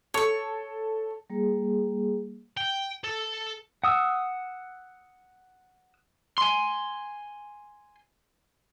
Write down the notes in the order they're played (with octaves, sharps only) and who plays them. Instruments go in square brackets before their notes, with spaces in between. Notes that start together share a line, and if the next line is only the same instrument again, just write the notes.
[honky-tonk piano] A4 [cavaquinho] C#5 C#6
[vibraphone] G3 A#3 G#4
[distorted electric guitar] G5
A4
[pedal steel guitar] F#5 D#6 E6
[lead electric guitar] G#5 C6